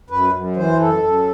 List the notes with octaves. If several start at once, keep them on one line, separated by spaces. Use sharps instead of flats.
F#2 B4
F#2
E3 C5
F#2 A4
F#2